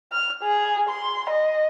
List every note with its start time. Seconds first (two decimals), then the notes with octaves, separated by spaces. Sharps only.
0.12 F6
0.43 G#4
0.89 C6
1.29 D#5